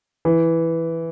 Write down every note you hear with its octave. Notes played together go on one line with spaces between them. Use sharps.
E3